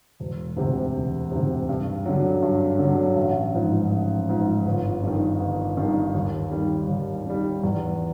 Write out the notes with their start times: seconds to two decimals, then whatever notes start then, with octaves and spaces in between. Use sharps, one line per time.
0.20 E1
0.57 D2 C3
0.94 E1
1.32 D2 C3
1.69 G2
2.06 D3 F#3
2.42 G2
2.79 D3 F#3
3.16 A1
3.54 G#2 F3
3.92 A1
4.29 G#2 F3
4.66 G1
5.02 G2 D#3
5.40 G1
5.77 G2 D#3
6.14 D#2
6.51 D#3 G3
6.89 D#2
7.26 D#3 G3
7.63 E2